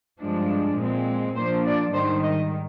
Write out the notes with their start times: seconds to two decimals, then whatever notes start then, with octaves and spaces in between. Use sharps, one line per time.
0.20 G2 F3 G#3 D4
0.77 A#2 G#3 C4
1.36 A#2 F3 A#3 D4 C5
1.66 D5
1.94 G#2 D#3 G3 C5
2.23 D#5